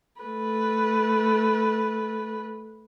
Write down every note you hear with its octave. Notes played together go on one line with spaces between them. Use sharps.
A3 B4